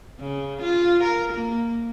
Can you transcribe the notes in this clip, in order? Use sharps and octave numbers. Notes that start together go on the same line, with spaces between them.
C#3
F4
A#4
A#3